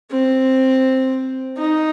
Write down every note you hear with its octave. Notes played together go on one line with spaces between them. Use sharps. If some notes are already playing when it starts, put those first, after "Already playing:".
C4
D#4